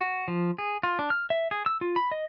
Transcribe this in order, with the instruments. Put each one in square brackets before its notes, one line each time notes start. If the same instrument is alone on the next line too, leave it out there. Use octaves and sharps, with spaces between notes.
[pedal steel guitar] F#4
F3
G#4
F4
D4
F6
E5
G#4
E6
F4
B5
D#5